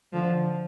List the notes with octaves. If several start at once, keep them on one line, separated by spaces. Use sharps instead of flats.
D3 F3